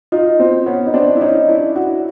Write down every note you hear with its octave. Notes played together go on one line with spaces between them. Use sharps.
D#4 F4
C4
B3 C#4
D#4
C4 D4
E4
C#4 D#4
D4 E4
E4 F#4